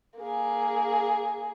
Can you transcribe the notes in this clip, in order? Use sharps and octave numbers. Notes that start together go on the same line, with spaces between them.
A#3 G#4